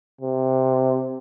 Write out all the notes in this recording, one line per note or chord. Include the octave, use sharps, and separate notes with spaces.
C3